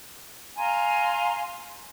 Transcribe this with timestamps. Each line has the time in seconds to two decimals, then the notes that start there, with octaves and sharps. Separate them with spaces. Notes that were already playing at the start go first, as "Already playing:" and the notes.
0.57 F5 G#5 A#5 C6